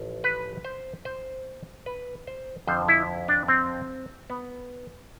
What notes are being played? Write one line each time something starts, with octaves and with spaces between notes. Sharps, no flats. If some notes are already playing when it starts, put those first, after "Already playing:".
Already playing: A1 F3
B4
C5
C5
B4
C5
F2 D3 F3 C5
E4
D4
C4
B3